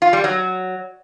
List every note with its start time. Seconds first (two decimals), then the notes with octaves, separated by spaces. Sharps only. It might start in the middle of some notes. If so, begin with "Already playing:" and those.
0.02 F4
0.13 G3
0.24 F#3